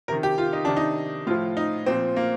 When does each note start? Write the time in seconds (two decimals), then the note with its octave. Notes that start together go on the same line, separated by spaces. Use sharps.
0.08 C3 D#3 A#4
0.23 G4
0.38 F4
0.53 D#4
0.65 C3 D#3 D4
0.77 D#4
1.27 A2 F3 F4
1.57 D#4
1.86 A#2 F3 C4
2.16 A#3